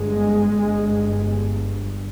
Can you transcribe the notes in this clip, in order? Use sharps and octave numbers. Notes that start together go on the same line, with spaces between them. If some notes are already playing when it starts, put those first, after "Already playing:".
Already playing: G1 G2 G#3
G1 G2